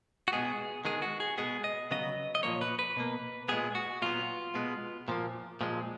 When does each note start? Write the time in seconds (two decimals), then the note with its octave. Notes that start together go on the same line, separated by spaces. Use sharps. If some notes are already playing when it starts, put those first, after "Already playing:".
0.28 F#4
0.32 B2 G#3 B3 G#4
0.85 D#3 G#3 B3 G#4
1.02 F#4
1.20 G#4
1.38 B2 G#3 B3 G#4
1.64 D#5
1.91 C#3 F#3 B3 D#5
2.35 D#5
2.43 A#2 F3 A#3 C#5
2.61 B4
2.79 B4
2.97 B2 A#3
3.48 A#2 G#3 B3 G#4
3.75 F#4
4.02 A#2 F#3 B3 F4
4.55 B2 G#3 B3
5.08 A#2 F3 A#3
5.61 A#2 F3 G#3